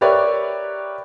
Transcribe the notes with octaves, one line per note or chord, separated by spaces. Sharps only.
G4 A#4 B4 C#5 D5 E5